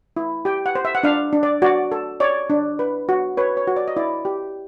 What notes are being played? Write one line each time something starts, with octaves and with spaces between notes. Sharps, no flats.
E4
G4 G5
F#5
C5
E5
F#5
D4 F5
D4
D5
F#4 D5
A4
C#5 D5
D4
B4
F#4
B4 C#5
C#5
F#4
D5
D#5
E4 D5
G4